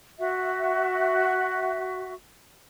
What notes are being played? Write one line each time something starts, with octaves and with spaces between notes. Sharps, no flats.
F#4 E5